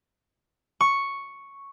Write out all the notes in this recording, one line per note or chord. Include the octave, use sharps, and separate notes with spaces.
C#6